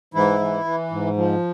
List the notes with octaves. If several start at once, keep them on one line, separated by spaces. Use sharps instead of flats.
G#2 E3 E4
E3
E3
G#2
F3